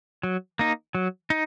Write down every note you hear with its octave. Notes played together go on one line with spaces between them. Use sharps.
F#3
A#3 D#4
F#3
D#4